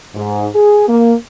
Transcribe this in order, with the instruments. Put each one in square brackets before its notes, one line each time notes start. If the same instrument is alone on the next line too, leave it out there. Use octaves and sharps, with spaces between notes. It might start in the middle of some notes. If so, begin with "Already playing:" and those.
[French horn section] G#2
G#4
A#3